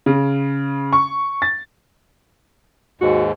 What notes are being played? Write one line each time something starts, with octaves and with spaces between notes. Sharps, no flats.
C#3
C#6
A6
D#2 G#2 F#4